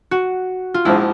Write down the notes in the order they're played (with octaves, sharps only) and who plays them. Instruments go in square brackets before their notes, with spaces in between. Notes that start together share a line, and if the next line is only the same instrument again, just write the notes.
[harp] F#4
F4
[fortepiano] A#1 G#2 F3 [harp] E4